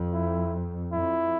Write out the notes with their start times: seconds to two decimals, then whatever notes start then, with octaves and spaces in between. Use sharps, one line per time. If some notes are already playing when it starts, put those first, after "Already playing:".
Already playing: F2
0.13 E4
0.92 F2 E4